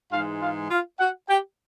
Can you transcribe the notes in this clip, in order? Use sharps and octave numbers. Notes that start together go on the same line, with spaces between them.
G#2 E3 G#3 F4 F5
F4 F5
F4 F5
F#4 F#5
G4 G5